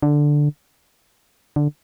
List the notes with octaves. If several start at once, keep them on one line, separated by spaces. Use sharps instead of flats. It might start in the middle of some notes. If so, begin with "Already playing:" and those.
D3
D3